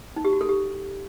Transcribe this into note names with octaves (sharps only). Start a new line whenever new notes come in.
D#4
G4
F#4
A4
G4